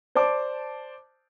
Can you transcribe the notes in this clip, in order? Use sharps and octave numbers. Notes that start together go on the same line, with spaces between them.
C5 D5 A5 D6